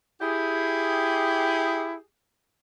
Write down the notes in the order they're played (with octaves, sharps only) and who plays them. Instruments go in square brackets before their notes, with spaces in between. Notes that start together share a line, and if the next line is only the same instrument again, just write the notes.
[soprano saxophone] E4 [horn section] G4 G#4